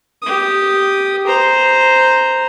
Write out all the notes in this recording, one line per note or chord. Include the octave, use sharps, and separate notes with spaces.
G4 D#6
C5 A#5